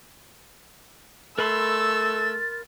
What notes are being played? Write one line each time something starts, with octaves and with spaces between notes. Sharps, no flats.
A3 A#4 B5 C6 E6 A6